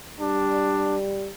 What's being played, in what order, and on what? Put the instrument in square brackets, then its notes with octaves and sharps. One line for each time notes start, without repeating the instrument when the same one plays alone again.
[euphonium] G3 [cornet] D4